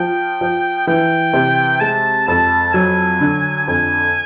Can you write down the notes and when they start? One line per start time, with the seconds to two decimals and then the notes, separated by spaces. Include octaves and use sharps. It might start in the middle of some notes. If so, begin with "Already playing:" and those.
Already playing: F3 G5
0.41 F3
0.87 E3 G5
1.33 C3
1.80 G#3 A5
2.28 F2 A5
2.74 F#3 G#5
3.21 D3
3.68 F2 G#5